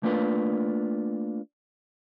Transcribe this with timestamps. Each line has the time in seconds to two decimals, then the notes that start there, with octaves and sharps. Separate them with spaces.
0.03 A3 A#3 D4 F4 B4